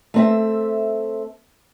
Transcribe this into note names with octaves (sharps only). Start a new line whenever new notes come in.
A3 C4 E5